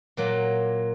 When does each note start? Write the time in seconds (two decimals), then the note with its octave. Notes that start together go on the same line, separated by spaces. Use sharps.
0.17 A#2 F#3 A#3